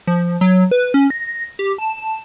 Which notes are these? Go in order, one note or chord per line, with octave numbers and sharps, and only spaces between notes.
F3
F#3
B4
C#4
A#6
G4
A5